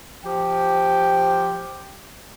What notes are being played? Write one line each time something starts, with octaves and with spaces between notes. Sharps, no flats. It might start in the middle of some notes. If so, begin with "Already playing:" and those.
F3 G4 G5